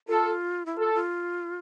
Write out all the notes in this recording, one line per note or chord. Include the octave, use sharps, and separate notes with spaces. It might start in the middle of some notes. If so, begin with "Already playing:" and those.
F4 A4
E4
F4 A4
F4